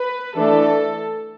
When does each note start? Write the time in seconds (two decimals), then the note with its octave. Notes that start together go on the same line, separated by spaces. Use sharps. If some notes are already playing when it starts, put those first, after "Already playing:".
Already playing: B4
0.36 E3 A3 D4 A4